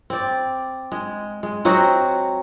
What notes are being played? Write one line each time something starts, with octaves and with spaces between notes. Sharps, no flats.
C4 D5
G#3
G#3
F#3 C4 F#4 D#5